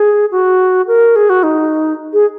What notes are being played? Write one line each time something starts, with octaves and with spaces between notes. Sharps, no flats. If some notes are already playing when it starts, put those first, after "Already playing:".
Already playing: G#4
F#4
A#4
G#4
F#4
D#4
G#4